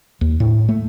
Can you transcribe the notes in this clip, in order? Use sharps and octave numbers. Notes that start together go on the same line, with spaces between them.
D#2
A2
A3